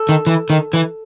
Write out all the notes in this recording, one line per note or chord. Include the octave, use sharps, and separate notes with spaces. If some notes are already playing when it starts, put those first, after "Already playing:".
Already playing: A4
D#3
E3
D#3
E3